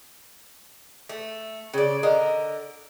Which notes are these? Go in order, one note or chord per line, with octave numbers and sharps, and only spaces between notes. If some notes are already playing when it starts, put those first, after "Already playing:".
A3
C#3 D5
D3 A#4 D#5